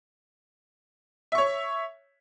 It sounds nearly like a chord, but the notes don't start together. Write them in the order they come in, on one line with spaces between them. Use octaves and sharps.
E5 C#6 C#5